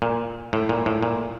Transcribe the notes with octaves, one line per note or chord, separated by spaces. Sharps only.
A#2
A2
A#2
A2
A#2